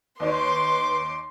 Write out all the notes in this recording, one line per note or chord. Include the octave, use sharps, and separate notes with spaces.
D#2 D#4 B4 C#5 C6 D6